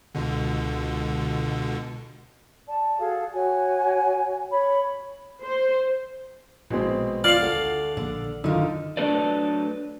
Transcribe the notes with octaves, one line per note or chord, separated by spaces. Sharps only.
C#2 B2 D3
D5 A5
F#4 G#4 A4 F5
F#4 C#5 G#5
C#5 B5
C5
A#1 B2 G#3 C4
F4 C5 D5 F5 F6 C7
D2 A4 F#5
A#1 D3
F#2 D3 D#3 D#4 F4
F#3 A3 D4 A4 B4 D5